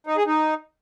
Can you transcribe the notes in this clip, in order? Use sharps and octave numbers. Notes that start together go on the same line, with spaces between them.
D#4
G#4
D#4